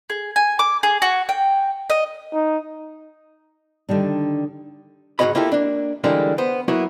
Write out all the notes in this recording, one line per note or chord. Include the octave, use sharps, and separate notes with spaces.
G#4
G#5
D6
G#4
F#4
G5
D#5
D#4
D3 D#3 G3 D4
C#2 G#2 F#4 C#5 D#5 B5
A#3 E4 F4 G4 A4
A#3 D4
D3 E3 G3 G#3 A#3 D4
B3 C5
F#3 A#3 B3 E4 F#4 C#5